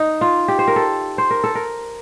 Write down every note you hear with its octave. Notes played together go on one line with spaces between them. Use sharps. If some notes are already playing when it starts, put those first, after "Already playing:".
Already playing: D#4
F4
G4
C5
A#4
A4
C5
A#4
A4
A#4